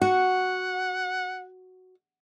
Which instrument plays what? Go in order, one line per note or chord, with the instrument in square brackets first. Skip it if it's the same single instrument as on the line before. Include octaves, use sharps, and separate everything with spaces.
[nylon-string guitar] F#4 [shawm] F#5